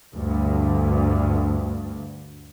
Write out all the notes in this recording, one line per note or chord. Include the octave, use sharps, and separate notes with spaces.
D2 G2